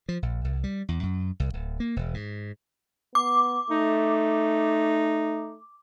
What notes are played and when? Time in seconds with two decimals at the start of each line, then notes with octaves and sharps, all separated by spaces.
0.09 F3
0.22 A#1
0.44 C2
0.64 G3
0.89 E2
1.03 F#2
1.40 C2
1.54 D1
1.80 A#3
1.96 E1
2.14 G#2
3.15 B3 D6
3.70 A3 D#4